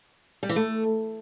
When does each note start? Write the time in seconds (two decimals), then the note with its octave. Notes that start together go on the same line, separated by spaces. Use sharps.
0.43 G3
0.49 E3
0.56 A3